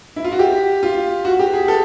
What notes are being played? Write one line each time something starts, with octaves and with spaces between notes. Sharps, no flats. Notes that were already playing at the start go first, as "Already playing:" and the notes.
E4
F4
F#4
G4
F4
F#4
G4
G#4
A4